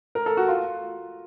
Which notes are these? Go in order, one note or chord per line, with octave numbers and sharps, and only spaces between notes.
A#4
A4
F#4
F4